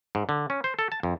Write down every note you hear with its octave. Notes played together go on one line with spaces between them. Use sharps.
G#2
D3
C#4
C5
A4
A5
F2